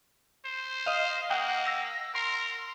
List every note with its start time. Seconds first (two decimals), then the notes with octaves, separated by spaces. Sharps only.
0.45 C5
0.86 D#5 F5
1.30 A#3 F#5 G5 D#6
1.65 E6 A#6
2.15 A#4 C6